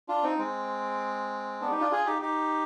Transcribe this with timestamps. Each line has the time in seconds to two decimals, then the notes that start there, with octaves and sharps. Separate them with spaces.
0.09 D4 F4
0.23 C4 D#4
0.38 G#3 C4
1.61 B3 D4
1.71 D#4 G4
1.81 D4 F4
1.91 F4 G#4
2.06 D#4 G4
2.22 D#4 G4